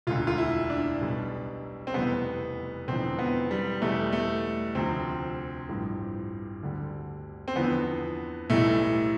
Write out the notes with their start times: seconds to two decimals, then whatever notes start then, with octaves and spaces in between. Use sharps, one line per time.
0.07 E1 D2 D3 F4
0.27 F4
0.38 E4
0.70 D4
1.01 B1 B2 G3
1.87 C4
1.94 F1 E2 B2 G3 B3
2.88 E1 E2 D3 F3 C4
3.19 B3
3.51 G3
3.82 E2 B2 G3 A3
4.12 A3
4.75 D2 C3 F3 C4
5.69 A1 G2 F3
6.62 D2 D3 G3
7.48 C4
7.56 E2 D3 F3 B3
8.50 B1 A2 E3 G3 A3